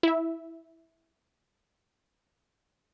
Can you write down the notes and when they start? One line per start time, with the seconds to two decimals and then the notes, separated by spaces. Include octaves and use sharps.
0.03 E4 E5